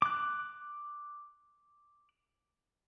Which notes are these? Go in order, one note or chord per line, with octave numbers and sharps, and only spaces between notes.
D6 F#6